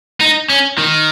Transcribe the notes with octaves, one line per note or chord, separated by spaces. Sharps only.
D#4
C#4
D#3